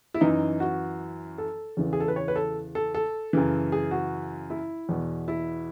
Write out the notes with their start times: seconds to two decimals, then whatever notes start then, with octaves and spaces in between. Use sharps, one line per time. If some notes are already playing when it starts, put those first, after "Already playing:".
0.14 E4
0.21 F#2 E3 D#4
0.60 F#4
1.38 A4
1.77 E2 C#3 E3
1.93 G#4
2.00 A4
2.08 B4
2.16 C#5
2.28 B4
2.36 A4
2.75 A4
2.95 A4
3.33 F#2 C#3 E3
3.72 G#4
3.91 F#4
4.50 E4
4.89 E2 B2
5.28 E4